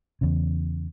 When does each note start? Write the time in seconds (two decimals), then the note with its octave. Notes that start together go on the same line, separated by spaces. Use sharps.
0.21 E2 C#3